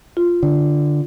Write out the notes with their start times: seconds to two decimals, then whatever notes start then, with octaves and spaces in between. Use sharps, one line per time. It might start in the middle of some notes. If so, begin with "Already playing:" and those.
0.17 F4
0.43 D3